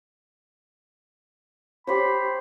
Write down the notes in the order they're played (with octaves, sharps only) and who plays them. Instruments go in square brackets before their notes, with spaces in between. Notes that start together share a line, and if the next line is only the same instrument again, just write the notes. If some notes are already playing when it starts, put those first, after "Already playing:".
[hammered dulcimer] G4 C5 C#5 [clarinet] B5